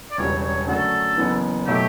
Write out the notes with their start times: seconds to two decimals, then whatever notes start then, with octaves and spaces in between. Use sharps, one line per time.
0.11 D5
0.18 E1 E2 C#3 G3 C#5
0.43 C#5
0.67 F#2 D3 A3 D4 F#4 A4
1.17 F#1 F#2 E3 B3
1.66 B2 F#3 A3 E4 G4